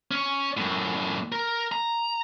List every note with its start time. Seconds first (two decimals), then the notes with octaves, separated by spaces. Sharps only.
0.11 C#4 C#5
0.57 F#2 A2
1.32 A#4
1.72 A#5